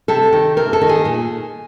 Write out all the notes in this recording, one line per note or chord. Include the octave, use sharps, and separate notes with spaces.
C3 A4
D#3
C3 A#4
A4
D#3
G#4
A#2